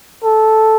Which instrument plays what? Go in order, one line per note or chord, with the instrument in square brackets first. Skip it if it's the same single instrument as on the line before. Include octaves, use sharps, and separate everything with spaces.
[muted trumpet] A4